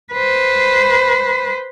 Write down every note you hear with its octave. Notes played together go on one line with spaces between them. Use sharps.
B4 C5